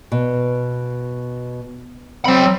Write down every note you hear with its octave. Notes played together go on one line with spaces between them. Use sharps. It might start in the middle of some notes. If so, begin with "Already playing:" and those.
B2
F#3 C4 B5